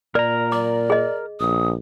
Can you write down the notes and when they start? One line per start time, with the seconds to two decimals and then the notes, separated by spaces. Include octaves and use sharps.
0.15 A#2 A#4 D5 A#5
0.52 D5 D6
0.90 G#4 D#5
1.40 A#1 D#6